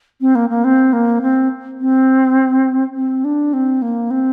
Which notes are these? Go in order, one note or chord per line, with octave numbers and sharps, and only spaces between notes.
C4
A#3
A#3
C4
A#3
C4
C4
C4
D4
C4
A#3
C4